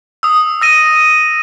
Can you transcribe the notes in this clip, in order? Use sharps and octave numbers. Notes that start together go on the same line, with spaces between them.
D#6 E6
E6 A#6 D#7